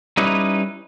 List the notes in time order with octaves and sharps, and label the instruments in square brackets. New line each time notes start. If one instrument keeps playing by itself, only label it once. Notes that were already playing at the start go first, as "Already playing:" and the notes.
[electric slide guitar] G3 C#4 D#4 E4 B4